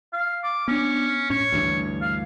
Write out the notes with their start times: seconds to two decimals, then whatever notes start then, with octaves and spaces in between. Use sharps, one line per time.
0.13 F5
0.44 D6
0.68 B3 C#4 D4
1.30 A2 C#4 C#5
1.53 D2 G2 E3
2.02 F5